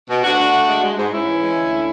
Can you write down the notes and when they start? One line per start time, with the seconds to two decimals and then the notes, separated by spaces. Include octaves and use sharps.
0.09 B2
0.23 D2 D4 F#4
0.38 D3
0.52 A3
0.68 G#3
0.83 G#3
0.97 G#2
1.12 G#2 C#4 E4
1.27 E3
1.42 G#3
1.57 D2
1.72 D3